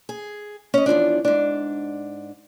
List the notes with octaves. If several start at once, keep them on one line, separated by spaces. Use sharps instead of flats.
G#4
C#4 D#5
E2 G#2 F3 D4
G#2 D4